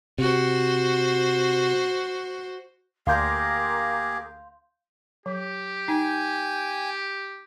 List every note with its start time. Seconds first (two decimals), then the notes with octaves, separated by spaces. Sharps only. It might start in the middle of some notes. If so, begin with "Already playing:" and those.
0.18 C3 F#4 C5
3.07 D2 A#3 G4 G#4 A#4 F5 C6 G6
5.26 F#3 G4
5.88 D#4 G5 G#5